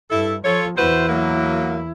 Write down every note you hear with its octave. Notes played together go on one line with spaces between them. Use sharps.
G2 E4 A4
F3 F4 A4 C#5
E2 E4 F#4 B4 C5
F#3 A#3